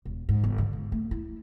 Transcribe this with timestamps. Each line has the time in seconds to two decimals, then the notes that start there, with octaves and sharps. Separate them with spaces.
0.05 E1
0.29 G#2
0.44 G1
0.58 D3
0.73 G#2
0.92 A3
1.11 E4